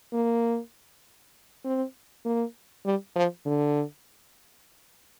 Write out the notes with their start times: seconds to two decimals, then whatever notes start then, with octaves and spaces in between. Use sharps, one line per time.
0.13 A#3
1.65 C4
2.25 A#3
2.86 G3
3.16 F3
3.46 D3